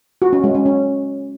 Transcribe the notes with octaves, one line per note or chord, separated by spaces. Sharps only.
F#4
C#4
G#3
C#4
C#4